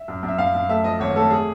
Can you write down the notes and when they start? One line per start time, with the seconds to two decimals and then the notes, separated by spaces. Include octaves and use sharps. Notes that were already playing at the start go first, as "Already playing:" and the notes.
Already playing: E5
0.08 F#2
0.23 F#2
0.28 E5
0.38 F#2 F5
0.55 F#2
0.69 A3 E5
0.84 F3 D#5
1.00 G#1 C#5
1.16 A3 A4
1.30 G#4